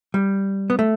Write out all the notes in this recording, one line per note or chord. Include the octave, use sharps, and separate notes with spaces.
G3
B3
A3